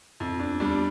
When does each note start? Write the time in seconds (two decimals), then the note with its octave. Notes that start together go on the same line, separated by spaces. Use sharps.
0.20 F2
0.40 D4
0.60 G3 D4